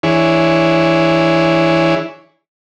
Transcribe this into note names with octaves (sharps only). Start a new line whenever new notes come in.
E3 D4 E4 G#4 C#5